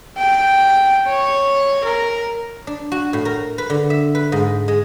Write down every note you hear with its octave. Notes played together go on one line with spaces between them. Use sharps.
G5
C#5
A#4
D4
F#4
A2
A#4
B4
D3
E5
B4
G#2
G#3